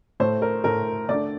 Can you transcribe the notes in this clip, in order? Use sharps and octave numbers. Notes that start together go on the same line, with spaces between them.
A2 A3 C5
A#4
A2 A3 A#4
D3 A3 D5